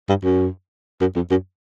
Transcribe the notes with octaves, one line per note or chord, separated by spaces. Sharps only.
G2
F#2
F#2
F2
F#2